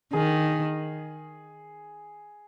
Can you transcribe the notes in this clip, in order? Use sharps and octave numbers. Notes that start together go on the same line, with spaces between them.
D#3 G#4